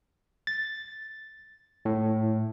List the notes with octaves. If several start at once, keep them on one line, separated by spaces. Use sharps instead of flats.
A6
A2